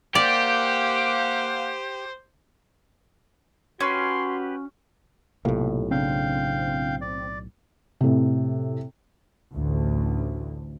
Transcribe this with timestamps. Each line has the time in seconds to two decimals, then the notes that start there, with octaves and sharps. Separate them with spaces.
0.15 A#3 G4 C5 D5 F5 F#5
3.80 C#4 F#4 G4 B4 C#5 C6
5.45 B1 A2 C3 A#3 F4 G4 A4
5.91 C#3 C4 D4 E4 F5 G5
7.01 D5
8.01 A2 C3
9.53 A1 D2